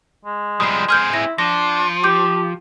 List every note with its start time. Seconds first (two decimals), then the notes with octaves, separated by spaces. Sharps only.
0.25 G#3
0.60 F3 G3 D#6 C7
0.88 C4 G#4 C6 F6 G6
1.13 E4 A#6
1.38 F3 D4 A#6
2.04 G4 D6 G6